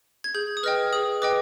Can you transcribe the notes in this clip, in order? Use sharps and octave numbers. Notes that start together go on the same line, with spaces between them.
G#6
G#4 G6
D#6
B4 D#5 G5 F6
G#4 D#6
B4 D#5 G5 D6